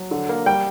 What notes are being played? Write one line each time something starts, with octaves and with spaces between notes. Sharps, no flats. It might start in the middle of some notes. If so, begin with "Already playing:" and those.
Already playing: F#3
D3
A#3
G3 G5